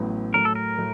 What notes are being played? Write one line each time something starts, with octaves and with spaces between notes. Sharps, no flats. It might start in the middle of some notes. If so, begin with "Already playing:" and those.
Already playing: A1 A2 F#3 B3
A2 F#3 A3 A#4
A4
A#4
A2 F#3 A3